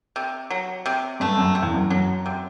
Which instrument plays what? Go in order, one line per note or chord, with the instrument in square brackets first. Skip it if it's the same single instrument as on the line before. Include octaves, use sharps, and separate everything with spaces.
[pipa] C3
F#3
C3
[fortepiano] G2 [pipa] A3
[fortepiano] F#2
[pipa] C3
[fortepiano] E2
F#2
[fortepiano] F#2 [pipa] F#3
[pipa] C3